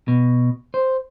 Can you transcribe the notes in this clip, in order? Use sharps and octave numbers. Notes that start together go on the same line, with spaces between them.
B2
C5